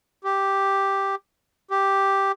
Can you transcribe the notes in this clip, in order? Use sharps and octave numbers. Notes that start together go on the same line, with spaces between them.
G4
G4